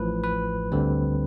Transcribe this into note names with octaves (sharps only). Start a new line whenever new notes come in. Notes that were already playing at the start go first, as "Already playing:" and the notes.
Already playing: A1 A2 F3 B4
B4
D2 D3 G3 C4